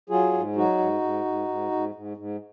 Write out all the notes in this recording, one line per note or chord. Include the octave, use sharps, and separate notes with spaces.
F#3 F4 G#4
G#2
F#3 D#4 F#4
G#2
G#2
G#2
G#2
G#2
G#2
G#2